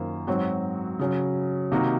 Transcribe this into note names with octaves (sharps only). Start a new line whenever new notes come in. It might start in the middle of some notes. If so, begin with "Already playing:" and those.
Already playing: F#2 D#3 A#3 F4 C5
G#2 F#3 C4 F#4 C#5
C#3 F#3 C#4
C3 D#3 A#3 D#4 F#4